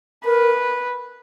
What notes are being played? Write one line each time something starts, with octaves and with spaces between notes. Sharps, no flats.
A#4 B4